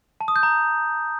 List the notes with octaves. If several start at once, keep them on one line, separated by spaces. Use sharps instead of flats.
A5
D#6
G6
A#5